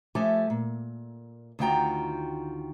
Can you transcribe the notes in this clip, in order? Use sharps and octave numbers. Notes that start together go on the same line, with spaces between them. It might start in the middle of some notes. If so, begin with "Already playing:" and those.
F3 A3 G4 A4 E5 G#5
A#2
D2 D#3 F4 F#4 G5 A#5